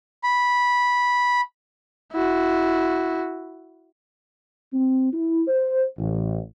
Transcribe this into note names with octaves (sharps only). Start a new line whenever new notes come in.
B5
E4 F#4
C4
E4
C5
A1